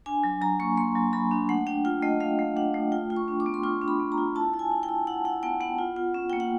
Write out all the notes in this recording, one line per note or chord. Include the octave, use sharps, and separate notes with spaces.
D4 G#5
F#3
F#3 A#5
A#3 C#6
A#3 C6
F#3
F#3 B5
D4
A3 F#5
D4 G5
F4 G5
A3 D#5
A3 F5
A3
D4 F#5
A3
F4 G5
F4
C#6
D4
D6
B3
C6
F4 C#6
D4
B5
B3
A#5
F4
E4 A5
E4
G#5
E4
G5
E4
E4 F#5
E4 F#5
B3 G5
B3 F#5
F4
F4
C#4
A#3 G5
F#5